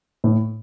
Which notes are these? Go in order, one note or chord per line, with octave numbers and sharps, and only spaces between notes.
A2